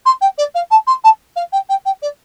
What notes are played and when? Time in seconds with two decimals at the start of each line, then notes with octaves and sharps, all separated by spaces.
0.05 C6
0.21 G5
0.38 D5
0.55 F5
0.71 A5
0.87 C6
1.04 A5
1.36 F5
1.52 G5
1.69 G5
1.85 G5
2.02 D5